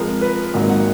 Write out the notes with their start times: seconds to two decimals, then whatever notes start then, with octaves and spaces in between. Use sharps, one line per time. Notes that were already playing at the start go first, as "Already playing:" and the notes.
Already playing: F2 F3 G#3 A#4
0.21 B4
0.54 G#1 G#2 D#3 F#3 A#3
0.69 F#5